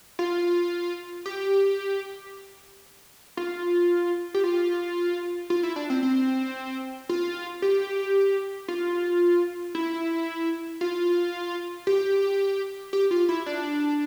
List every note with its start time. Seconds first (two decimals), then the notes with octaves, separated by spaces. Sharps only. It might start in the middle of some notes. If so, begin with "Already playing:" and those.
0.19 F4
1.26 G4
3.37 F4
4.34 G4
4.44 F4
5.50 F4
5.63 E4
5.76 D4
5.90 C4
6.03 C4
7.09 F4
7.62 G4
8.68 F4
9.75 E4
10.81 F4
11.87 G4
12.93 G4
13.11 F4
13.29 E4
13.46 D4